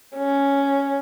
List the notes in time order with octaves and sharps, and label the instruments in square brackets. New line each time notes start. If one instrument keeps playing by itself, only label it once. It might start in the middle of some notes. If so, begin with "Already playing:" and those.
[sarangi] C#4